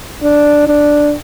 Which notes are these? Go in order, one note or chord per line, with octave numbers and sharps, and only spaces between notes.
D4
D4